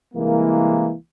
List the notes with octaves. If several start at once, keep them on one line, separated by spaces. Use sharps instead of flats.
C2 E3 G#3 A#3